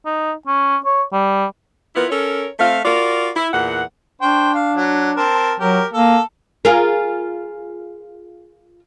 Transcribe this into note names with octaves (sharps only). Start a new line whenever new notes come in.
D#4
C#4
C#5
G3
B3 E4 F4 A#4
C#4 A4 A#4 C#5
A3 C4 F5
F4 F#4 A#4 D5
E4
E2 A#2 F#5
D4 C5 G5 C#6
F5
F#3
C4 A#4 A5
F#3 G4 A#4
A#3 A4
F4 G#4 A#4